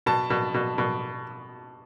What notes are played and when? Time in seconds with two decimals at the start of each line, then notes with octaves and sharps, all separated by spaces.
0.06 B2 A5
0.30 B2
0.54 B2
0.78 B2